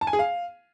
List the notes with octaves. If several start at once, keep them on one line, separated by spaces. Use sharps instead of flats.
A5
G#5
G#4
F5